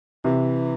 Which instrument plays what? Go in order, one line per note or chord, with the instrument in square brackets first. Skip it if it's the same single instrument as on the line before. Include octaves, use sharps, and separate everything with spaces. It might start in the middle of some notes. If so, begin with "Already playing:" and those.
[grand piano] C3 [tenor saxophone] E3